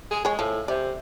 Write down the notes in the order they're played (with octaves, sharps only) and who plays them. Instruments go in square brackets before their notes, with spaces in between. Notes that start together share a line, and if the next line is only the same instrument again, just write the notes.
[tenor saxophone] G#4
[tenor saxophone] G#3 [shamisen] G#4 C#5
[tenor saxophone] A2 [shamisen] F3
[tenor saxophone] C3 [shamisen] D5